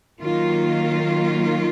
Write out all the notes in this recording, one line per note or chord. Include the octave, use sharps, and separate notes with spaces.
D#3 F#3 A#3 F4